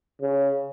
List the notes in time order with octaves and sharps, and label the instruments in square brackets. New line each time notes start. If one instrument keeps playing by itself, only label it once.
[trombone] C#3